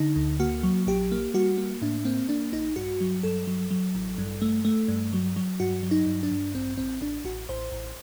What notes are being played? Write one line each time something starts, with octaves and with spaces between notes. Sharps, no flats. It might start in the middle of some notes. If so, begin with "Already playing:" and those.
Already playing: D3 D#4
D2
A#3 F#4
F#3
A#1 G4
A#3
G3 F#4
A#3
A2 D4
A#3 C4
A#3 D4
A#1 D#4
G2 F#4
F#3
G2 A4
F#3
F#3
A1
G2
A3
A3
G2
F#3
F#3
G2 F#4
F#3
D#4
G2
D4
G2
A1 C4
A1 C4
A1 D4
A1 F#4
A1 C5
A1